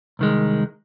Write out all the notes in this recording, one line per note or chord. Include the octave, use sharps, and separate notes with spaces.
C2 D#3 G#3